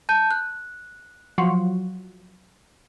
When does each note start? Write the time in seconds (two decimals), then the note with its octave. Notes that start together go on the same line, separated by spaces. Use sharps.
0.09 A5 G6 D#7
0.31 F#6
1.38 F3 F#3